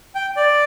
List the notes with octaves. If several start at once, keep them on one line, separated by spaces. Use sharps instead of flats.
G5
D5